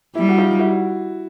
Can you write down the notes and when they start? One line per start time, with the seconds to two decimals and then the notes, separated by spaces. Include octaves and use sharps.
0.15 G3 E4
0.29 F#4
0.38 D#4 F4
0.59 E4 F#4